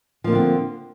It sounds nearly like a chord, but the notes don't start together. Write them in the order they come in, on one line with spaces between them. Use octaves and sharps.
F3 A#3 F4 D3 C4